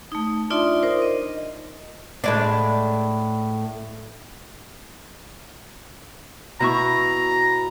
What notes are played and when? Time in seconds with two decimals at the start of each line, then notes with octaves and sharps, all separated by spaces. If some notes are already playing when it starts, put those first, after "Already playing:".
0.12 A3 D#4
0.50 D4 D#4 F4 D5 E5 C6
0.83 D#4 A#4 C5
1.02 D#5
2.24 A2 G#3 D4
6.60 B2 E4 A#5 C#6